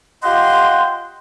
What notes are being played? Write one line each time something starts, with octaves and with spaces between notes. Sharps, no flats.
F4 G4 D#5 F#5 G5 C6